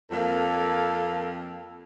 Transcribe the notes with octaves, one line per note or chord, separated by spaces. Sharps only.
F2 A#3 A4 F5